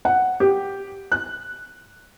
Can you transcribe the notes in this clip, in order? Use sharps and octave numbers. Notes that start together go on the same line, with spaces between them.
F#5
G4
F#6